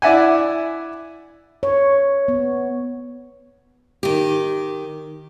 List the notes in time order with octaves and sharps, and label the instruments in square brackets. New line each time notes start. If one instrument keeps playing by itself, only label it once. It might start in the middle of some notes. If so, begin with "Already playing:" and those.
[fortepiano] E4 D5 E5 F#5 G#5
[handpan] C#5
B3
[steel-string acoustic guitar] D#3 G4